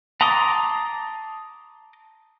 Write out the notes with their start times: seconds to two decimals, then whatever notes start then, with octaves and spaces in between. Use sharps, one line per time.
0.21 A5 A#5 C6 D6 D#6